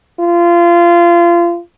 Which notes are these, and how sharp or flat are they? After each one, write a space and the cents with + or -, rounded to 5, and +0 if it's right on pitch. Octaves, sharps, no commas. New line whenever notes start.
F4 -25